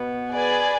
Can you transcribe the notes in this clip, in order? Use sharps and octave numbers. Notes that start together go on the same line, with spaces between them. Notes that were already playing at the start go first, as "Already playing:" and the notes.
Already playing: B2 B3
G#4 B4 D5 G#5